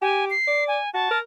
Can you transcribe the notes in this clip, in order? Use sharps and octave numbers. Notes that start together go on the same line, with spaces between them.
G4 G#5
C7
D5
G#5
F#4 A5
A#4